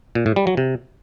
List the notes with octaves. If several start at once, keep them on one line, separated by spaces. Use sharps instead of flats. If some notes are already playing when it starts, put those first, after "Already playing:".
A#2
A2
G3
F#3
C3